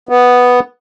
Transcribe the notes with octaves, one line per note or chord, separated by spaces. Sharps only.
B3